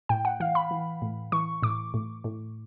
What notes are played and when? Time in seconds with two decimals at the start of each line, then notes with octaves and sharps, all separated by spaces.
0.09 A2 G5
0.25 F#5
0.40 E3 F5
0.55 B5
0.71 E3
1.02 A2
1.32 E3 C#6
1.63 A2 D6
1.94 A2
2.24 A2